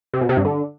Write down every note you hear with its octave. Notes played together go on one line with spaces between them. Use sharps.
C3
B2
C3
G2
D3